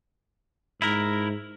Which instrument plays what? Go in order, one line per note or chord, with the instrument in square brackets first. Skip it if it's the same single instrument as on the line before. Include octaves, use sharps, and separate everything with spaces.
[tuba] G#2 [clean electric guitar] E4 A#4